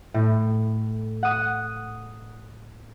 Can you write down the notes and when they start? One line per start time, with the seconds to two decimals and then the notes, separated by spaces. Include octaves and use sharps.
0.14 A2
1.23 F#5 D#6